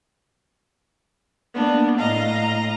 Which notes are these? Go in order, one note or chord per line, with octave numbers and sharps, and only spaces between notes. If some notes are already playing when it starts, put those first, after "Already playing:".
A#3 B3 D4
A2 D#5 F5 A#5